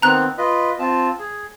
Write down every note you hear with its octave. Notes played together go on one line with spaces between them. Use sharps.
D#3 B3 C4 A#5 F#6
F4 B4 D#5
C4 F4 A5
G#4